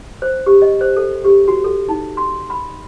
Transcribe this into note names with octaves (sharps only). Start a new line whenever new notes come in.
C5
G4
D#5
C5
A4
G4
F#4
A4
D#4
C6
B5